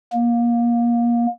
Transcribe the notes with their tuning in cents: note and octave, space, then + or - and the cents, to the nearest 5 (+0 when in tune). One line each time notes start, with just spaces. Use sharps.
A#3 +25